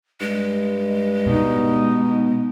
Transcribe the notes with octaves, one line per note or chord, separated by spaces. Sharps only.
G2 G#3
B2 D#4